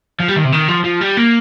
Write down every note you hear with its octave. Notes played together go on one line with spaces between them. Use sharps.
F3
G3
D#3
C3
D#3
F3
F3
G3
A#3